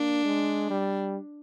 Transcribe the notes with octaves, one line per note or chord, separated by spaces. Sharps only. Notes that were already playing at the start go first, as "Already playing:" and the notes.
Already playing: A#3 D4
G#3
G3